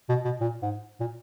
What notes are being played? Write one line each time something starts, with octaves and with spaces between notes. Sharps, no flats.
B2
B2
A#2
G#2
A#2